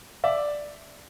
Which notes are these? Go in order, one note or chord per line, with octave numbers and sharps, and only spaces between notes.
D5 E5